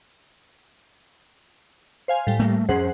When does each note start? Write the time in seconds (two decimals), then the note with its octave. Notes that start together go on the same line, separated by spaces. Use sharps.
2.08 C5 F5 G#5
2.27 A2 G3
2.40 A3 A#3
2.69 F2 C#4 G#4 C5 F#5